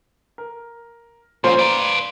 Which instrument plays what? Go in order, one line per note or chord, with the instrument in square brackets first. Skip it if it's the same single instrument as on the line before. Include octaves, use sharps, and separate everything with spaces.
[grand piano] A#4
[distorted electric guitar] A#2 [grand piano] F3 A#3 C#4 [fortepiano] C5 [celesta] C6
[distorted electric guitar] B4 D5 [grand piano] F5 A#5